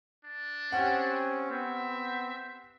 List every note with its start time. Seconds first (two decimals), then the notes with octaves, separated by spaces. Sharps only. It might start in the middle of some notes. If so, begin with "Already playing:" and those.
0.25 D4
0.72 C4 C#4 G4 F#5
1.51 B3 C4 E5